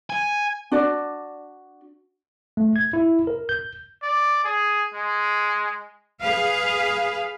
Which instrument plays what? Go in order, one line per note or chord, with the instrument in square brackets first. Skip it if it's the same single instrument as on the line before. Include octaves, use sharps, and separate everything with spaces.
[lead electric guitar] G#5
[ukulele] D4 F#4 D5
[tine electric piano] A3
G#6
E4
A#4
G6
[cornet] D5
G#4
G#3
[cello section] G#4 B4 F5